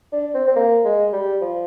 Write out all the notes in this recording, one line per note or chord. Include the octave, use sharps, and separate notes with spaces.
D4
C4
C4
A#3
G#3
G3
F3